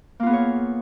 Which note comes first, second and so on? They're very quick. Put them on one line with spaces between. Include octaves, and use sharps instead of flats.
A#3 F4 B3 G#4 C#5